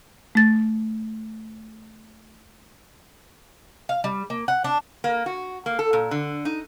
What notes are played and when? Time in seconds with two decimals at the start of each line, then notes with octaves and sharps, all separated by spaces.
0.35 A3 A6
3.89 F5
4.04 G3
4.30 A#3
4.48 F#5
4.64 D4
5.04 A#3
5.26 F#4
5.66 A#3
5.79 A4
5.93 A#2
6.11 D3
6.45 D#4